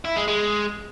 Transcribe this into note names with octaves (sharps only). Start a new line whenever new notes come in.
E4
G#3
G#3